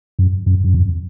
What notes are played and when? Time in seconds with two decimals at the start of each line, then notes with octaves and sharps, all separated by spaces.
0.19 F#2
0.46 F#2
0.64 F#2
0.74 F2